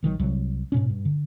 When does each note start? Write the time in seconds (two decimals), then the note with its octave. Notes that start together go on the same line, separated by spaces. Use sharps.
0.03 A#1 D#3 E3 F#3
0.19 C2 F#3
0.72 G#2 B2 C#4
0.90 G2
1.05 D3